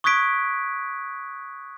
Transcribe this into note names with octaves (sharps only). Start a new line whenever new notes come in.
C#6 D#6 F#6 G#6 B6 D7